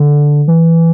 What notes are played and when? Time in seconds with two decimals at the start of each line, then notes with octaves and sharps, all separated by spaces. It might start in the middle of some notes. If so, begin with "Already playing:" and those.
Already playing: D3
0.48 E3